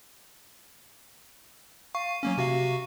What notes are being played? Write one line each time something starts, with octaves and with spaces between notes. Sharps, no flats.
F5 C#6
F#3 A#3 C#4
C3 F#4 F5